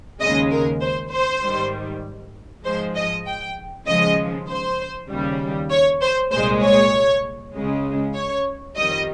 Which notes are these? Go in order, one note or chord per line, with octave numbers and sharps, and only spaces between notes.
D#2 C#3 G#3 D#5
A#4
C5
C5
G#2 D#3 G3
G#2 F3 G#3 C5
D#5
G5
D#2 C#3 F3 G#3 D#5
C5
D#2 C#3 G3
C#5
C5
C2 A#2 G#3 C5
C#5
C#2 C#3 G#3
C#5
F2 D#3 G3 D#5